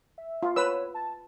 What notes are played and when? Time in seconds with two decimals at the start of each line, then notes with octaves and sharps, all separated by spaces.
0.18 E5
0.43 F4
0.56 B4 C#5 E6
0.94 A5